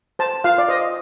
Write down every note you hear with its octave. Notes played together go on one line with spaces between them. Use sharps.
C5 A5
F4 F5
D5
C5 D#5